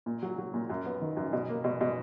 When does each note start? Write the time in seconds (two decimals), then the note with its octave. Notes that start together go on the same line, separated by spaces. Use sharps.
0.06 A#2
0.23 F#3
0.38 F#3
0.54 A#2
0.70 F#2
0.86 B3
1.02 D#3
1.17 F#2
1.33 B2
1.49 A#3
1.64 B2
1.81 B2